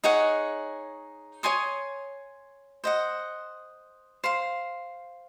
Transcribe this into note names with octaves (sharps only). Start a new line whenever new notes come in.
D#4 G#4 C#5 F#5
C#5 G#5 C6 D#6
C5 D#5 F#5
C5 F5 C6